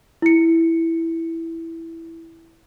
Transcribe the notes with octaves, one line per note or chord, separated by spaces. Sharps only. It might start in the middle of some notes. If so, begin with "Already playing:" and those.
E4 C#7